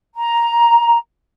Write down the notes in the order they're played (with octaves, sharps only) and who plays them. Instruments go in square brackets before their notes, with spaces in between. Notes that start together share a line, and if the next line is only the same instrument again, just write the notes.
[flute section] A#5